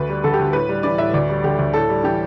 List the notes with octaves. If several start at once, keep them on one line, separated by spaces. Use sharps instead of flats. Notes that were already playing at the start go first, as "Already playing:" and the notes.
Already playing: D2 B4
G3
D3 A4
G4
D2
A2 B4
G3
E3 D5
A2 E5
D2 D5
G3
D3 G4
D2
A2 A4
G3
E3 G4